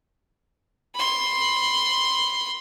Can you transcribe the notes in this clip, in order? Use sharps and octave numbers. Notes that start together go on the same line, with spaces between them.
B5 C6